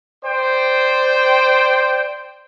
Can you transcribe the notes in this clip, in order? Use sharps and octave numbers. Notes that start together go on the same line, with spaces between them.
C5 D5 G5